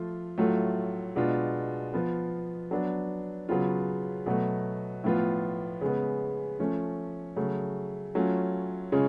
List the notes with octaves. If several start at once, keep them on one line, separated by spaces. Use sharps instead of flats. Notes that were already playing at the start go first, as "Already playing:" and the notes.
Already playing: F3 A3 F4
A2 F#3 A3 F4
B2 G#3 D4 F4
F3 B3 F4
F#3 B3 D4
C#3 F#3 B3 F4
B2 F#3 A3
A2 F3 B3 F4
C#3 G#3 B3
F3 A3 C#4
C#3 F#3 A3
F#3 A3 C#4 F4
C#3 G#3 C#4 F4